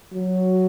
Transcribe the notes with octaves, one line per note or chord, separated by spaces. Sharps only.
F#3